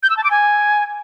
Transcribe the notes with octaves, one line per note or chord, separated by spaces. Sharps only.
G6
E6
A5
D6
G#5